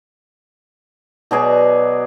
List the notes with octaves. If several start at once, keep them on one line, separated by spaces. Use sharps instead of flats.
B2 F#3 G#4 D5